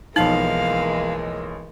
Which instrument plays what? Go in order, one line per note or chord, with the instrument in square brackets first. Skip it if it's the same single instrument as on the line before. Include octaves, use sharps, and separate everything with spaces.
[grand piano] B1 F3 F#7 [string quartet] E3 G#3 A#3 [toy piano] D#4 [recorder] F5